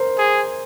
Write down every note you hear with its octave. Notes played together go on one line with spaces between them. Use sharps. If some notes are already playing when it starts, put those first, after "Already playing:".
Already playing: A#4 C5
G#4